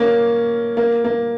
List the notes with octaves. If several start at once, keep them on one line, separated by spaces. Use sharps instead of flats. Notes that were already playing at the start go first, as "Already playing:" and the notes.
Already playing: A#3 C#4
A#3
A#3